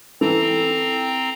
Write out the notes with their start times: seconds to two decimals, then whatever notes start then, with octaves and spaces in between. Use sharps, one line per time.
0.21 E3 C4 A4 A#5